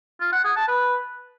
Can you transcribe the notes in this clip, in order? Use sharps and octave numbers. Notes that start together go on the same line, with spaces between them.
F4
F#5
G#4
A5
B4